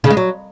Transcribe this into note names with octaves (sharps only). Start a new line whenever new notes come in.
C#3
G#3
F#3